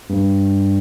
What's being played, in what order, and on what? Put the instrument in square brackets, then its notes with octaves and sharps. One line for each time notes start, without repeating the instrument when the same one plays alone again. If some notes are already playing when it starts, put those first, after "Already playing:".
[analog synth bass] G2